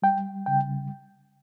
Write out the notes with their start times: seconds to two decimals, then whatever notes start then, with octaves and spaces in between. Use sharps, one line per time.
0.02 G3 G5
0.46 C#3 G5